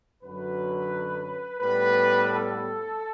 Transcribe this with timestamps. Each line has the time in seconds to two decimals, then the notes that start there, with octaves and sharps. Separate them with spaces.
0.23 F#2 D3 F#3 B4
1.60 A2 G3 B3 B4
2.28 A4